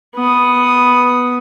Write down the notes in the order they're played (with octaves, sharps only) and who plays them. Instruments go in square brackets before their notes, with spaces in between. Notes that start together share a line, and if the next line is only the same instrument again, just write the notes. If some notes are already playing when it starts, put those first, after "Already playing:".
[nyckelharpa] B3 D#6